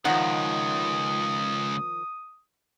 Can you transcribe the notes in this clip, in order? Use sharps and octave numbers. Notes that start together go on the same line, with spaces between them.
C#2 D#3 F3 F#5 D#6